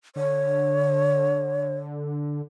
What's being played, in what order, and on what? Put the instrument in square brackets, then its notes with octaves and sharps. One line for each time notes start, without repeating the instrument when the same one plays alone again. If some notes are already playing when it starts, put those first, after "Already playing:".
[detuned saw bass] D3 [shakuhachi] C#5